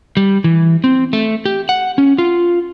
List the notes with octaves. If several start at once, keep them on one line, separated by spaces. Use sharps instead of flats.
G3
E3
C4
A3
G4
F#5
C#4
F4